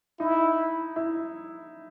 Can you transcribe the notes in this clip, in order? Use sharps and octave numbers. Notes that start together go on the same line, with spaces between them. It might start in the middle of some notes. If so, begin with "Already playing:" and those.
D#4 E4
E4